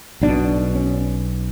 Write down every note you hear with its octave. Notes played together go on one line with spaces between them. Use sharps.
B1 B2 D4
C#4